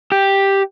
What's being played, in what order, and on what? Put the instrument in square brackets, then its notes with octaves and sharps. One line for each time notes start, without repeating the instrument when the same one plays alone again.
[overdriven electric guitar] G4